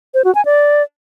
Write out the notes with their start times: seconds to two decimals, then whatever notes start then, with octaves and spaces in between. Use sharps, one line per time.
0.14 C5
0.25 F#4
0.35 G#5
0.45 D5